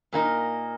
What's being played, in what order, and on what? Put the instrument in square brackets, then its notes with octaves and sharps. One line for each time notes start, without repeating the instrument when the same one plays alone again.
[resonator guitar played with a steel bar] A#2 A#3 D#4